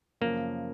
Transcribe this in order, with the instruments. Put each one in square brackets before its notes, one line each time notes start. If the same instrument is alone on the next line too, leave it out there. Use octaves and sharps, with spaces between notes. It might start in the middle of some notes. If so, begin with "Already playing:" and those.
[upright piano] F#2 C#3 F3 [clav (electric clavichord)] A#3